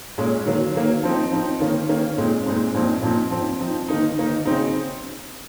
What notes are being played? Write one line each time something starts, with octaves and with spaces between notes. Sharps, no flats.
A#2 G#3 C#4
D#3 F#3 A#3
D#3 F#3 A#3
F3 C4 D#4
F3 C4 D#4
D#3 A#3 C#4
D#3 A#3 C#4
A#2 G#3 C4 D#4
A#2 G#3 C4 D#4
A#2 F3 C4 D#4
A#2 F3 C4 D#4
F3 C4 D#4
F3 C4 D#4
D#3 A#3 D#4
D#3 A#3 D#4
C#3 F#3 C4 D#4